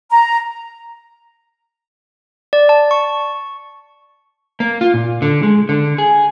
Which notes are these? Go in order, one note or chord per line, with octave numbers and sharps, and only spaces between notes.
A#5
D5
A5
C#6
A#3
F4
A#2
D3
G#3
D3
G#4